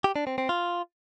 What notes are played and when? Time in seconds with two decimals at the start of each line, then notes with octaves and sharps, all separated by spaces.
0.04 G4
0.16 D4
0.27 C4
0.38 C4
0.49 F4